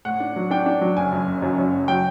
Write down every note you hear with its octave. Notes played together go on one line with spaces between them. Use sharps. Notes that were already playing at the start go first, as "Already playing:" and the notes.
A2 F#5
D4
F#3
D4 G5
D4
F#3
F#1 G#5
F#2
F#1
F#2
F#2
F#1
F#3 G5